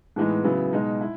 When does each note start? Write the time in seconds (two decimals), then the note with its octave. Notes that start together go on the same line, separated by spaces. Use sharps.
0.16 A2 E3 G#3 B3 D#4
0.44 C#3 F#3 B3 E4
0.73 B2 G#3 D#4
1.01 E4